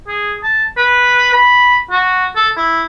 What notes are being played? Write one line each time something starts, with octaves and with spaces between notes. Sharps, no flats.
G#4
A5
B4
B5
F#4
A4
E4